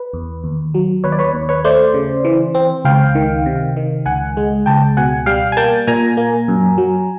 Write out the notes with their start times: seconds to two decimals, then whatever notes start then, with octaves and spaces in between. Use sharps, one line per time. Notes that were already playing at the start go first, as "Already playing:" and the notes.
Already playing: B4
0.14 E2
0.44 D#2
0.74 F#3
1.04 D#2 B4 C#5
1.12 D5
1.19 B4 C#5
1.34 D#2
1.49 B4 C#5
1.64 A3 C5 D5
1.94 C#3
2.25 E3
2.55 C4
2.85 C#2 F5 G5
3.15 D#3
3.46 C3
3.76 D#3
4.06 C#2 F#5 G#5
4.37 G#3
4.66 C#2 G5 A5
4.97 B2 F#5 G#5
5.26 G3 F5 G5
5.52 G#5
5.57 A#3 G5 A5
5.87 A#2 G#5 A#5
6.17 A#3
6.48 F#2
6.78 F#3